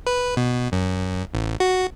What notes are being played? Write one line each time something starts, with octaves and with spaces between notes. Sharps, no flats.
B4
B2
F#2
A1
F#4